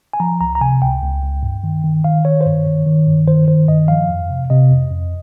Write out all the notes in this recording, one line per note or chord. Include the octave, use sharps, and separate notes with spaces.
G#5
F3 A#5
C#2 A#5
A#5
C3 G#5
C#2 G5
C#2
C#2
G2
D#3
D#3
D#3 F5
D#3 C#5
C5
G2 C#5
D#3
D#3
G2
D#3 C5
D#3 C5
G2 D#5
F3 F5
F2
C3
C3 D#5
F2
F2